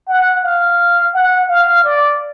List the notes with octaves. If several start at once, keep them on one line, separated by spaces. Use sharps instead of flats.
F#5
F5
F#5
F5
D5